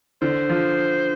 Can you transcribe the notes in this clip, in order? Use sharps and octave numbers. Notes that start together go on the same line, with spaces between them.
D3 C5
F3